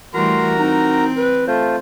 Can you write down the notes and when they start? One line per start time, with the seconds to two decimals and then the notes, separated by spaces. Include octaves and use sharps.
0.14 E3 G3 A3 F#4 A#4 A#5 C6
0.59 C4 D#4
1.17 B4
1.48 A3 F4 C5